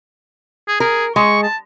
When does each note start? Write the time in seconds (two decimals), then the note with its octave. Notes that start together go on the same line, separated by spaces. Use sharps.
0.68 G#4
0.80 G#4 A#4
1.16 G#3 C#6
1.43 A5